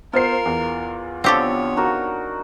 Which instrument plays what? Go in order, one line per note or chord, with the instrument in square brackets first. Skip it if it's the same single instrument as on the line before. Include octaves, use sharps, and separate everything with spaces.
[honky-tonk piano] B3 C5 C7 [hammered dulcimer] F4 [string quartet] A#4
[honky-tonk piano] E2
[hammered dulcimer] D3 F3 C#6 [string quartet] B3 C#5 [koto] C4 G4 A4
[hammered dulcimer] D#4 F#4 A#4